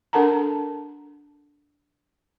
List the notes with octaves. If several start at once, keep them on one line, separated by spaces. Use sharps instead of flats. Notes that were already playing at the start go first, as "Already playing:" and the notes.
D4 A4 A#4 F#5 A5 A#5